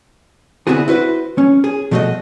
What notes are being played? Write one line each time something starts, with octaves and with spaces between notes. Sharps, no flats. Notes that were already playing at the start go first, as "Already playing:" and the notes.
D3 B3 C4 E4 F#4 G#4
E4 F#4 B4 C5
C#4
G#4
B2 F3 A3 F#4 D5 D#5